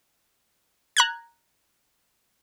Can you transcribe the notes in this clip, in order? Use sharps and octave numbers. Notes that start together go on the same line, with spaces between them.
A#5 F#6 G#6